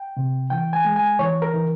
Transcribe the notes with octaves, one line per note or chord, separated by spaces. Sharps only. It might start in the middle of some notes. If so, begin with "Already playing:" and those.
Already playing: G5
C3
E3 G5
G#5
G#3
G#5
E3 C#5
A#4
E3